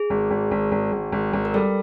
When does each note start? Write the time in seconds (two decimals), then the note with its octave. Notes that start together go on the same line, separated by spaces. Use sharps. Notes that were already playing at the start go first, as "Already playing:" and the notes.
Already playing: G#4
0.10 G#1
0.31 G#1
0.51 G#1
0.72 G#1
0.93 G#1
1.12 G#1
1.33 G#1
1.45 A#4
1.54 G3 A4